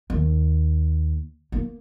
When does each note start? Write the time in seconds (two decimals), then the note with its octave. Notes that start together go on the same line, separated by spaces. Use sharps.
0.10 D#2
1.52 A#3